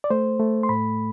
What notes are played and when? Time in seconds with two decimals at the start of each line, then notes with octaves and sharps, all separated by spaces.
0.04 D5
0.10 A3 C5
0.40 A3
0.63 C6
0.69 A2 B5